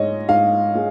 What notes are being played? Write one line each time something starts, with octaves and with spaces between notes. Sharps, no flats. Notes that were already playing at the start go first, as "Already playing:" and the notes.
Already playing: G#2 G#3 C#5 D#5
G#2 F5
G#3